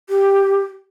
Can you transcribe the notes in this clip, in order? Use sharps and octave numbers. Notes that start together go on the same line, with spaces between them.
G4